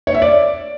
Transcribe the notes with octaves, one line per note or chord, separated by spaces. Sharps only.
C#5
E5
D5